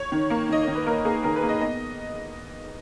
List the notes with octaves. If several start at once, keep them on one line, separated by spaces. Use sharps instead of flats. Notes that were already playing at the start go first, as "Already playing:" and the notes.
Already playing: C#5
D#3
A#3
D#3 D#5
D#3 C#5
B4
A#3 A#4
A#3 G#4
D#3 A#4
B4
A#3
D#5
B3 D#5